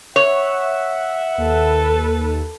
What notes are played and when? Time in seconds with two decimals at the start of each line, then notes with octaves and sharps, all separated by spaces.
0.16 C#5 E5 F#5
1.38 D#2 A4 B4